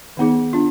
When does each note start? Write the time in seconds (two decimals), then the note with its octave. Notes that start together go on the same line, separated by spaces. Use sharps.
0.17 D#3 B3 D#4 G#4
0.53 D4 F4